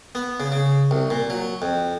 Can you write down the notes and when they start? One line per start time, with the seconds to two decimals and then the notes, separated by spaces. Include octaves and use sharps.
0.15 B3
0.40 C#3
0.52 C#3
0.91 C2
1.10 A#2
1.30 F#3
1.62 F2